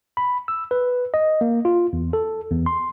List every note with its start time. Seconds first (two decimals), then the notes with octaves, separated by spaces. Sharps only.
0.17 B5
0.48 E6
0.71 B4
1.14 D#5
1.41 A#3
1.65 F4
1.93 E2
2.13 A4
2.52 E2
2.66 C6